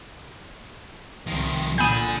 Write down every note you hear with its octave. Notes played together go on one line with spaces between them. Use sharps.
C2 D#3 F3
A#2 D3 D4 G#5 B5 D#6 G6